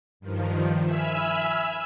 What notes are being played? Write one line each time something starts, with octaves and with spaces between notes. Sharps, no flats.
G2 D#3 F3
E5 G#5 B5 E6 F6